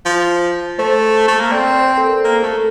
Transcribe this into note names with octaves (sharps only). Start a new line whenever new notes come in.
F3
A3 C5
A3
A#3
C4 D5
C5
C5
A4
A#4
A#3 A4
A3 A4